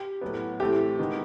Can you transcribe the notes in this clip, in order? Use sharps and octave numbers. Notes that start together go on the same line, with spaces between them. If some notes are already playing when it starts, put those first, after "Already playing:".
Already playing: G4
A2 F#3 B3
A2 E3 A3 C4 G4
D#3 G#3 B3